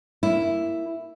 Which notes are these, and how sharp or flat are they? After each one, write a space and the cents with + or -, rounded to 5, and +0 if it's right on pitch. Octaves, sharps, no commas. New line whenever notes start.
A#3 +0 E4 +5